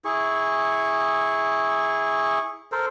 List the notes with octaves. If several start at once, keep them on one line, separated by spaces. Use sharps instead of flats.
E4 G#4 C#6
A4 A#4 C5